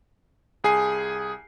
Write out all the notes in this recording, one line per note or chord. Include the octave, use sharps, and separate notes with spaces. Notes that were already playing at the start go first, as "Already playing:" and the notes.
C2 G#4 G#5 C7